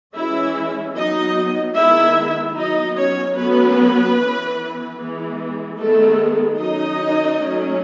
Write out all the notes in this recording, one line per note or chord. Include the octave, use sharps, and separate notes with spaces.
E3 G#3 C#4 E4 E5
F#3 B3 D#4 D#5
D#3 G#3 B3 E4 E5
F#3 B3 D#4 D#5
C#4 C#5
F#3 A3 B3 C#4 B4
E3 B3
E3 G#3 B3
D#3 G#3 A3 B3 A4
D#3 F#3 C#4 D#4 D#5
F#3 A3 C#4